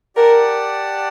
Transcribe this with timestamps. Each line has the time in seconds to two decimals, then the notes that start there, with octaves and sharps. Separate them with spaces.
0.16 G4 A#4 D5 F#5 A5